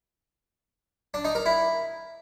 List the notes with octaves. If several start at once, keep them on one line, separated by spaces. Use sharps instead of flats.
D4
D#4
A#4
E4